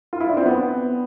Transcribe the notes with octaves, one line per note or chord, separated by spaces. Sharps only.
F4
E4
D4
C4
B3